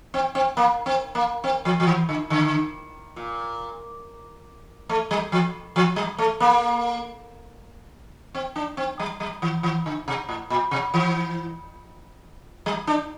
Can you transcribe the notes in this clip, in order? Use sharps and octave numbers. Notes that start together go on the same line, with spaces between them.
C4
C4
A#3
C4
A#3
C4
F3
F3
E3
D3
D3
A#2
A3
G3
F3
F3
G3
A3
A#3
C4
D4
C4
G3
G3
E3
E3
D3
C3
A2
A#2
C3
E3
G3
D4